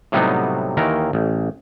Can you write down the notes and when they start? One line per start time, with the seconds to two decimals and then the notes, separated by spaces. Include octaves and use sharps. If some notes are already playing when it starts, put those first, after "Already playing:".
0.12 A2 C3 F#3 G3 B3 D#4
0.77 D#2 D#3 E3 A#4
1.13 A1